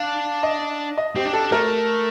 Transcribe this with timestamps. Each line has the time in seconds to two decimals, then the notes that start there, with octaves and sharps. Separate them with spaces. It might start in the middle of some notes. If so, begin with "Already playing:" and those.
Already playing: D4 F5
0.43 D#5
0.98 D#5
1.15 C4 G4
1.25 D4
1.33 A4
1.52 A3 A#4